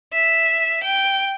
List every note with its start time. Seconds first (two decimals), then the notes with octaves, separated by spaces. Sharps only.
0.13 E5
0.83 G5